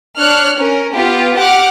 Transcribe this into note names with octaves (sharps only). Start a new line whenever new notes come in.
D4 C#5 F6 F#6
C#4 A#4
B3 F4 G4
G4 F#5 D6 F6